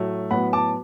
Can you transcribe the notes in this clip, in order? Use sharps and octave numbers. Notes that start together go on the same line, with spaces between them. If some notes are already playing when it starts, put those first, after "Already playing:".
Already playing: A2 F#3 A3
A2 F#3 B3 F#5 B5
A5 D6